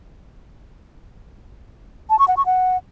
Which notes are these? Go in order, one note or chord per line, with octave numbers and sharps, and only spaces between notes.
A5
C#6
F#5
C#6
F#5